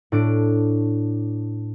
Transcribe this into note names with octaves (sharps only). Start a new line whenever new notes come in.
A2 D4 D7